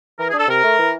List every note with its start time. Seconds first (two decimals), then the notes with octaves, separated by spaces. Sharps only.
0.19 E3 A#4
0.28 G#4
0.33 D4
0.38 A4
0.48 C3 A#4
0.64 A3
0.79 E3